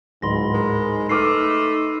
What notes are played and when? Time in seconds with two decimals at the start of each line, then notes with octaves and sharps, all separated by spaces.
0.22 D1 G#2 B5 C6 A#6
0.54 G#3 A#4
1.09 A3 D#4 B4 D6 F6 C7 D#7